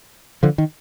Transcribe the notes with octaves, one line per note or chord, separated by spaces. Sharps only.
D3 F3
D#3